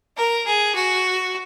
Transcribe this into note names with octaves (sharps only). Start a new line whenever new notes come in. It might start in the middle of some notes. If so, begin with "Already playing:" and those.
A#4
G#4
F#4